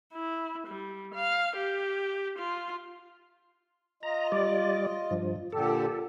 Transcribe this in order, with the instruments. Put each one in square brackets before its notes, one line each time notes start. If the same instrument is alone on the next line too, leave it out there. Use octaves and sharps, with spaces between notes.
[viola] E4
G3
F5
G4
F4
[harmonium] F4 D#5 [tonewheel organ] A#5
[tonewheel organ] G3 D5
G2 F3
[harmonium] A#2 D3 G4 [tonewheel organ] A4